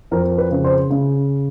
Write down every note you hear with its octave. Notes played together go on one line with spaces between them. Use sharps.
F2 A#4
B4
C#3
C5
C#3